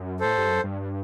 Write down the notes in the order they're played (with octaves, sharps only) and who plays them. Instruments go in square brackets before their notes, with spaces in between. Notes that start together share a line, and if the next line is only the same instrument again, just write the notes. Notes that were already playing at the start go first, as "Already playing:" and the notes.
Already playing: [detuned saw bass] F#2
[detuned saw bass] A2 [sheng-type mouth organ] A4 C5
[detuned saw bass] G2
F#2
G2